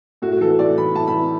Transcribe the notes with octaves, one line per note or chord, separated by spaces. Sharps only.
A2 F#4
F#4
E3 A4
A2 D5
E3 B5
A2 A5
B5
E3